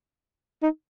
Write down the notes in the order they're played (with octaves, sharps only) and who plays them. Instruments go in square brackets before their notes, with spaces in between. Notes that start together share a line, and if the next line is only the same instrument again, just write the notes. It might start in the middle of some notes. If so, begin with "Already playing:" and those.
[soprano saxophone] D#4